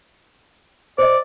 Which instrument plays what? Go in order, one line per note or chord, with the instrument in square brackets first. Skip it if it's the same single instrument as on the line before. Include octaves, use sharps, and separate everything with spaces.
[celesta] C5 D#5 [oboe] D5